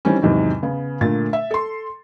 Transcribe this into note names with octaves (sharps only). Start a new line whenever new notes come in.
D#3 E3 G3 C4 C#4
E2 G#2 C3 D#3 F#3
C#3 B3
A#2 D3 A3 A#4 A6
E5
A4 C6